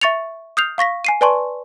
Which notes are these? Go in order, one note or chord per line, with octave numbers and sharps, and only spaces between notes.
E5 C#6 A6 C#7 F7
D#6 F6 G6 C7 F7
F5 C#6 A#6 B6
G#5 C7 D#7
B4 D5 G#5 A5 C6 C#6